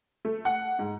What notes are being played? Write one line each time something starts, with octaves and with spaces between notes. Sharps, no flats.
A3
F#5
G#2